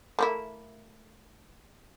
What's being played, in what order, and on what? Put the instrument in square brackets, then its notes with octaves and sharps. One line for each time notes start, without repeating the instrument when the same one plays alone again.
[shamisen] A3 A#3 E4